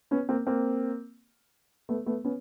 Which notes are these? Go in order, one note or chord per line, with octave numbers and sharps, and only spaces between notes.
B3 C#4
A#3 C4
A#3 C4
A3 B3
A3 B3
B3 C#4